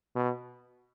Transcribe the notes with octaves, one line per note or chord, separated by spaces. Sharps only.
B2